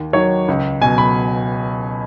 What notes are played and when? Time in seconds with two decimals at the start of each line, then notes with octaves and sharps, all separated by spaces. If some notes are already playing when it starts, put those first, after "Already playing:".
Already playing: D#2
0.13 D#3 F#3 C#5
0.48 C#2
0.81 B2 F#3 G#5
0.98 B5